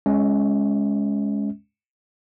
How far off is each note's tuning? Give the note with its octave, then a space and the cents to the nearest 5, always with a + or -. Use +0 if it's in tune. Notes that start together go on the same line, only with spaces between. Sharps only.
G#3 +0 C#4 +5 E5 -45